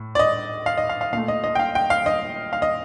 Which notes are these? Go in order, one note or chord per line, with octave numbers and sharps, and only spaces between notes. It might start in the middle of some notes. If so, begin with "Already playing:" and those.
Already playing: A2
D5
D#5
F5
D#5
F5
F5
A#2 A3 F5
D#5
D#5
G5
F5
G5
F5
D#5
F5
D#5